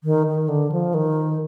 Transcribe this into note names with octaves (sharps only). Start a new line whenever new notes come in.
D#3
D#3
D3
F3
D#3